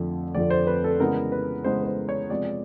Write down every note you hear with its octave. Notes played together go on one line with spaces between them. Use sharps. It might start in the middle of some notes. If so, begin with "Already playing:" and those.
Already playing: F2 D3 F3 A3
F2 D3 F3 A3 D5
C5
B4
A4
C#3 E3 G#3 B3 A#4
B4
C#3 E3 G#3 B3 C5
B4
C5
C#5
C3 F3 G#3 B3 D5